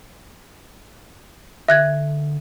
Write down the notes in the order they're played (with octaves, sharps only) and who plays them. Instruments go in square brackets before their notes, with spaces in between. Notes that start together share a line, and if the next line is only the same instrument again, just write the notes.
[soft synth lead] D3 [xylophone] E5 F#6 G#6